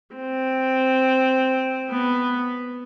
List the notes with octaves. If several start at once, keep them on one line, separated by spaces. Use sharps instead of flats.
C4
B3